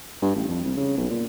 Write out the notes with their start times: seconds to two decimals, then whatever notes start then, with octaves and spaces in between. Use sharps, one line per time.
0.22 G2
0.36 A1
0.47 F2
0.64 C2
0.77 C#3
0.98 B1
1.10 A#2